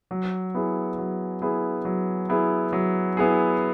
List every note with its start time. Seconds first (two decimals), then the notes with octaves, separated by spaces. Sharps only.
0.11 F#3
0.54 B3 E4 G#4
0.98 F#3
1.42 B3 E4 G#4
1.85 F#3
2.29 B3 E4 G#4
2.73 F#3
3.17 B3 E4 G#4